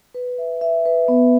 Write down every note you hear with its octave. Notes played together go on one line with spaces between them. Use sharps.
B4
E5
E5
B4
B3